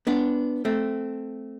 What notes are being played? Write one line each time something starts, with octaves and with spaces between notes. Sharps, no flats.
B3 D4
A3 C4